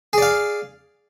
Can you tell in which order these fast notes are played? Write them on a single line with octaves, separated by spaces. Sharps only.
G#4 D5 F5